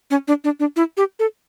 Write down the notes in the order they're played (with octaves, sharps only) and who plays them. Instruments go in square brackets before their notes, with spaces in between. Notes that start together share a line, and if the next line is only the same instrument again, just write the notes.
[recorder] C#4
D4
D4
D4
E4
G4
A4